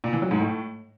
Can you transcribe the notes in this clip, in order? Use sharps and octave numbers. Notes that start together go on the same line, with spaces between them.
A#2
E3
F#3
G#2
A2